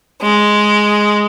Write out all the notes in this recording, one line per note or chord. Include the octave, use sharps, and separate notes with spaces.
G#3